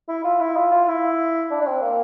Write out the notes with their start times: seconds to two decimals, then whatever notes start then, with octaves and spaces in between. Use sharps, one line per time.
0.08 E4
0.24 F4
0.40 E4
0.56 F4
0.71 F4
0.88 E4
1.51 D4
1.61 D4
1.67 C4
1.81 A#3